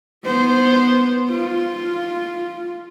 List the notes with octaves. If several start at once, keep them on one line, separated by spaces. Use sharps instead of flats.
B3 C5
F4